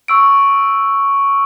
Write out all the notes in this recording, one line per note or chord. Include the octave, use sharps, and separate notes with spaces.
C#6 E6 D7